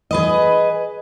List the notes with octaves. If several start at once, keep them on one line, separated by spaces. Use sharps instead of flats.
G#4 B4 D#5